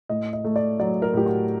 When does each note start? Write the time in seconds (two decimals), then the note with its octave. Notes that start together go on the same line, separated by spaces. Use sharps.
0.09 A2 D#5
0.33 D#5
0.44 A3
0.56 D5
0.80 F#3 D5
1.02 A#4
1.13 A2 G4
1.26 F#4